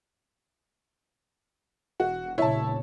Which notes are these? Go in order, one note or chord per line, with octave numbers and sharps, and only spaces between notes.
E1 F#4
A#1 C#3 E4 C#5 A5